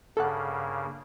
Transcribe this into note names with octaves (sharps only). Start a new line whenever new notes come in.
G2 C#3 A#3 A4 F#5